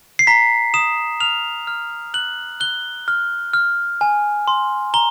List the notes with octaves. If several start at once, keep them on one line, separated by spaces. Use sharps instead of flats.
C7
A#5 B6
D#6 E7
F6 F7
F6
F#6 F#7
F#6 G7
F6
F6
G#5
C6
A#5 G7